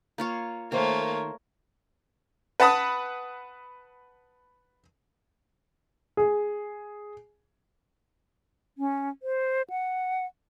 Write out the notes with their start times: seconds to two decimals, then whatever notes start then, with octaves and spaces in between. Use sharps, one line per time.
0.18 A#3 F4 C#5
0.72 D#3 A3 A#3 A#4 C5 C#5 A#5
2.60 B4 F#5 A5 B5 D#6
6.17 G#4
8.78 C#4
9.23 C5
9.70 F#5